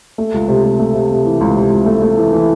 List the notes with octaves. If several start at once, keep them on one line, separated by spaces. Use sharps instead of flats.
A3
C#2
C3
C3
A3
C3
C3
E3
C#2
C3
C#2
A3
A3
E3
E3